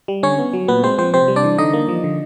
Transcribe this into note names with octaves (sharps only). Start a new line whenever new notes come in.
G3
D3 C#4 C#5
B3
F#3
A#2 B3 B4
G#3 C4 C5
F3 C4 C5
C3 C4 C5
G3
D4 D5
E3
D3 D#4 D#5
A#3
F3
D3